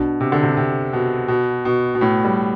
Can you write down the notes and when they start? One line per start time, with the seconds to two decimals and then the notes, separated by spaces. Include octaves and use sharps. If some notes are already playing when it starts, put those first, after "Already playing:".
Already playing: B2 D4
0.21 C3
0.32 D3
0.43 C3
0.57 C3
0.93 B2
1.28 B2
1.65 B2
1.95 B2
2.01 A2
2.24 G3